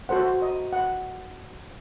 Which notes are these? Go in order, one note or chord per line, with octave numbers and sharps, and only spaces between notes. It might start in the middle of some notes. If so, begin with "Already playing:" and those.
F#4 A4 C5 F#5
D#5
F#5